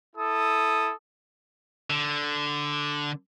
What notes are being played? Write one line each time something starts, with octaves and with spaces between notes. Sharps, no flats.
E4 A4 D#6
D3